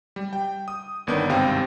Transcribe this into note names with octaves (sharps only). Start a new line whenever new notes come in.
G3
G5
D#6
G1 D#3 B3 D4 G6
G#1 G2 C3 C4 F5 G5